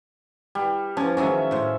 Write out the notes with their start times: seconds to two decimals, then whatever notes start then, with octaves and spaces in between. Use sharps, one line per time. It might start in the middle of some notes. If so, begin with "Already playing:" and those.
0.55 G3
0.97 F3 C#4
1.17 D#3 F#3 G#3 C#4 E5
1.51 A2 C5